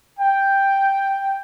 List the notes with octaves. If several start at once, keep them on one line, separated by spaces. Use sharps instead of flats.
G5